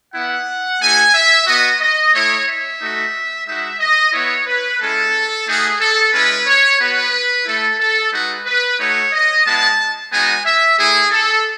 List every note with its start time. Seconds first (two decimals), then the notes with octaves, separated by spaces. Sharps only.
0.14 B3 E4 F#5
0.80 A3 D#4 F#4 G#5
1.14 E5
1.47 B3 F#4 D#5
1.81 D#5
2.13 A3 E4 C#5
2.47 E5
2.81 A3 D#4 F#4
3.46 G#3 D#4 F#4 E5
3.80 D#5
4.12 B3 E4 C#5
4.47 B4
4.79 G#3 C#4 E4 A4
5.46 A3 D#4 F#4 G#4
5.79 A4
6.12 G#3 C#4 E4 B4
6.46 C#5
6.79 B3 F#4 B4
7.46 A3 E4 A4
7.78 A4
8.12 G#3 D#4 F#4 B4
8.45 B4
8.78 A3 D#4 F#4 C#5
9.12 D#5
9.45 G#3 B3 E4 A5
10.11 G#3 B3 D#4 F#4 G#5
10.45 E5
10.78 A3 E4 G#4
11.11 A4